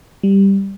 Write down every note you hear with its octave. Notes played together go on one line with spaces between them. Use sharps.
G3